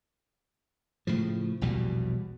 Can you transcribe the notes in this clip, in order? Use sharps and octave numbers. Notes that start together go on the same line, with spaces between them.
A2 C#3 F3
A#1 E2 B2 G3